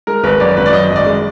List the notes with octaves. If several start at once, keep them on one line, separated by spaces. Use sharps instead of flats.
G#3 A#4
G#1 B4
F#2 D5
G#1 B4
D5
F#2 D#5
G#1
D5
G#3